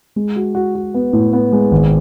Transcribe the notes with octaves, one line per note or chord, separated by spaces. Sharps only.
G#3
F#4
F#4
F#4
B3
A2
B3
G#3
G#1